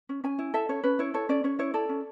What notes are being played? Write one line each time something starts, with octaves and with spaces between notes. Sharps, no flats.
C#4
C#4 G#5
E4
A4 E5
C#4 C#5
C#4 B4
E4 C#5
A4 C#5
C#4 D5
C#4 C#5
E4 C#5
A4 D5
C#4